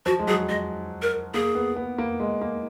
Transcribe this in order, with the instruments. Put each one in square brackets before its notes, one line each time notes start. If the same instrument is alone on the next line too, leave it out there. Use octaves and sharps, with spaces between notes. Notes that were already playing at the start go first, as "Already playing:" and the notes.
[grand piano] F3 [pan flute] F#4
[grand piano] G#3
[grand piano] F#3 [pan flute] G#4
[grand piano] G#3 [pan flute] D#5
[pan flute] A#4
[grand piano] A#3 [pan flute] G#4
[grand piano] B3
B3
A#3
G#3
A#3